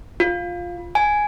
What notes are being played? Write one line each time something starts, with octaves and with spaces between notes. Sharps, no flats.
F4
G#5